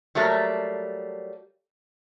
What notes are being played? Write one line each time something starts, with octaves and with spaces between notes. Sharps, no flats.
F#3 G3 A3 A#3